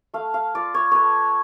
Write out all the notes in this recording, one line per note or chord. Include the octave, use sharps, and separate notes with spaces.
A3 F5
F5
F4 D5
C#5
A3 B4 C#5